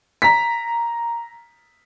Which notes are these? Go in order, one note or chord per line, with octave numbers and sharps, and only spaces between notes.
A#5 B6